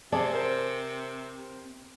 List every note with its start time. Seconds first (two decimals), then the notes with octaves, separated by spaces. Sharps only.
0.12 C3 C4 G#4 D5 A5
0.33 A#4 C5